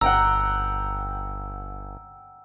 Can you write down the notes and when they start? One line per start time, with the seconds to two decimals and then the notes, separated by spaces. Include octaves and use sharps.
0.01 G1 F#5 G5 A#5 E6